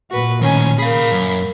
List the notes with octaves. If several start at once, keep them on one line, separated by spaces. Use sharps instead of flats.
A#2 F#4 B4
A2 D#3 C#4 G#5
A#3 G#4 F5 B5
F#2